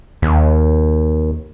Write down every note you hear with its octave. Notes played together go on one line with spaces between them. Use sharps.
D#2